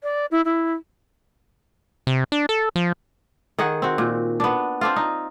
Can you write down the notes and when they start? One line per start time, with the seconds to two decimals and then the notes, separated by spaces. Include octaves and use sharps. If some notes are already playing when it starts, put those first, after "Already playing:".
0.03 D5
0.31 E4
0.45 E4
2.07 C3
2.32 D4
2.49 A4
2.76 F3
3.59 D#3 G#4 F#5
3.82 C4 F#4
3.98 A#2
4.40 B3 D4
4.81 C4 D4 F4
4.96 D#4